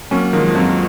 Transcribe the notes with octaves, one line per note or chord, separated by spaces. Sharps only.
F#3 A#3 C#4
D#3 F3 G#3
F3
F2 F#3